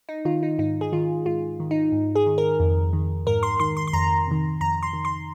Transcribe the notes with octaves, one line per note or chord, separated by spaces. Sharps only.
D#4
D#3 F4
D#4
G#2 D#4
G#4
D#3 F4
G#2 F4
D#3
D#4
G#2
G#4
D#3
A#4
F2
D#3
G#2 A#4
C6
D#3 C6
C6
C6
F2 A#5
C3 D#3
F2 A#5
C6
D#3
C6